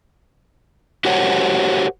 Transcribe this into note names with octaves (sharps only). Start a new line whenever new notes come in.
F#4 G4 A#4 C5 C#5 F#5